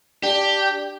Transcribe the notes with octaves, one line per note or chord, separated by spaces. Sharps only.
D4 G4